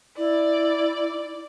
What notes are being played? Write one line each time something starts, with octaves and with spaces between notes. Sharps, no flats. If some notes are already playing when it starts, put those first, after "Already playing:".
E4 D5